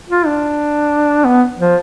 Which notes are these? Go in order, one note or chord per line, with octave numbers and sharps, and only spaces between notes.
F4
D4
B3
F3